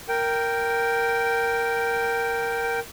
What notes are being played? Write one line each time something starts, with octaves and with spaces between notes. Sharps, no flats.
A#4 G5